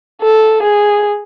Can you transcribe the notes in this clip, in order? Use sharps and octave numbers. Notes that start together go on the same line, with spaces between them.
A4
G#4